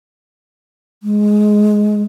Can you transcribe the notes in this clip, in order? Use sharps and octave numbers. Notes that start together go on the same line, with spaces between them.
G#3